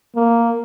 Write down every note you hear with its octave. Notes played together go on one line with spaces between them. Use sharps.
A#3